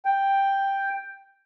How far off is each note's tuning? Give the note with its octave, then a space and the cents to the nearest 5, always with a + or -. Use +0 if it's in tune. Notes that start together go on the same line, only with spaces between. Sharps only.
G5 +5